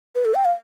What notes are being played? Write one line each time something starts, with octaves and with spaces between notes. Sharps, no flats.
B4
A4
G5
F5